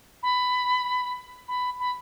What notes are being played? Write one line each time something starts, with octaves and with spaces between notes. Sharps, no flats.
B5
B5
B5